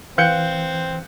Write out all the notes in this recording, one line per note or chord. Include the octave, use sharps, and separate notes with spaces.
E3 C4 B4 F5 G5 F#6 G6 C#7